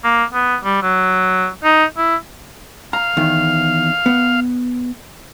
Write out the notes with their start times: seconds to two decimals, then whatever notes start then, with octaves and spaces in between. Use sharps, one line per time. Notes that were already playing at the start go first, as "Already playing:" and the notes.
0.04 A#3
0.33 B3
0.64 G3
0.82 F#3
1.64 D#4
1.97 E4
2.93 F5 A#5
3.17 E2 D#3
4.06 B3